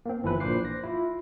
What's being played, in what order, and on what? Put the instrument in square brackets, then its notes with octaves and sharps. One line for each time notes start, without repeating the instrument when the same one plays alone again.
[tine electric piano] A#3 C4
G1 E3 F3 E4 B4
A#1 A#2 C5 D6 F#6 C7
A#6
E4 F4